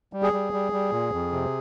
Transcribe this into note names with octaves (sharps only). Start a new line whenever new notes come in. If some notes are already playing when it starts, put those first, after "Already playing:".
G3
G#4
G3
G3
G3
A#2
F2
C3